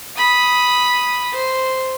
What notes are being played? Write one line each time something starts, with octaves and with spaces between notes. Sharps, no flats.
B5 D#6
C5